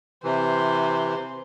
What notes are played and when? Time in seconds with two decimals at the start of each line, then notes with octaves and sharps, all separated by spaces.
0.24 C3 E3 C5